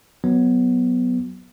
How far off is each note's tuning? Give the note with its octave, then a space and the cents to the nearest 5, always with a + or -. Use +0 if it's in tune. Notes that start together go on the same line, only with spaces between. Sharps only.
F#3 +0 B3 +0